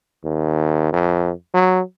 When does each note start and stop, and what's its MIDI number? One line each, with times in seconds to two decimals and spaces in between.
0.24 0.89 39
0.93 1.31 41
1.54 1.81 54